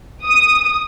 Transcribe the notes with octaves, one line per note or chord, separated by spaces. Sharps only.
D#6